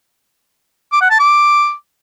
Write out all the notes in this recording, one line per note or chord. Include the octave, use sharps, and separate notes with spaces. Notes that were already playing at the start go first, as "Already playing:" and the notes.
D6
F#5
A5
D6